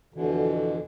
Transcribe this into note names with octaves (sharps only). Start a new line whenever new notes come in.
F2 B2 D3 E3